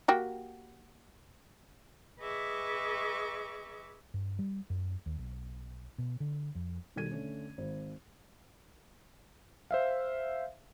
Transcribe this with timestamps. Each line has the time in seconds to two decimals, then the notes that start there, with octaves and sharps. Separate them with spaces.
0.08 A#3 F#4 G4
2.21 G#4 B4 D#5 E5 C#6 D6
4.14 G2
4.39 G3
4.70 F#2
5.06 D#2
5.18 B1
5.98 B2
6.20 D3
6.55 F2
6.96 B2 D#3 G3 A4 G#6 D#7
7.11 D3 A3 C#4
7.58 G#1
9.71 C5 E5 F5